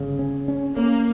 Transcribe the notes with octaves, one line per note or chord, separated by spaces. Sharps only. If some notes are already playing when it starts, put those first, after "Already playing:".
Already playing: G1 C#3
C#4
C#4
A#3 C#4